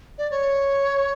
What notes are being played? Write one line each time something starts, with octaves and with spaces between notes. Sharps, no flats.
D5
C#5